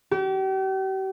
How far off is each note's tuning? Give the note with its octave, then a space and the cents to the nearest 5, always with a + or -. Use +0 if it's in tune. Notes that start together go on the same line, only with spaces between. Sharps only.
G4 -40